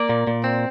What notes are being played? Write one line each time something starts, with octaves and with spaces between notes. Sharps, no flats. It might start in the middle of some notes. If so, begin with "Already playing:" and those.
Already playing: A#3 D5
A#2
A#2
C4